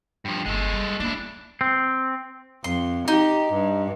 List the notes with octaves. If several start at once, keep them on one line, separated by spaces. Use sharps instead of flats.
G2 F3
G1 G#3 A4
G3
D#3 A#3 D4 E4
C4
F2 C6
D#4 G4
G2